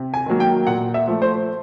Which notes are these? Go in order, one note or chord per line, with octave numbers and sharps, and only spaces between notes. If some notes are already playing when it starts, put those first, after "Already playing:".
Already playing: C3
G#5
D#3 F#3 A#3
G5
A#2 F#5
E5
F3 A3
C5